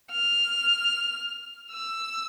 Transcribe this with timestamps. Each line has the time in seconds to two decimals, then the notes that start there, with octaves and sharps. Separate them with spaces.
0.11 F6
1.71 E6